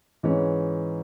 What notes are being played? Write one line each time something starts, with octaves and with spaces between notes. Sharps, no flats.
G#2 E3 G#3 C#4